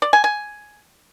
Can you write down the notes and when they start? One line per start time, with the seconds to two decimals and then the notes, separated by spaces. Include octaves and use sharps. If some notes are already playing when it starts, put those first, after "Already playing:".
0.02 D5
0.13 G#5
0.24 G#5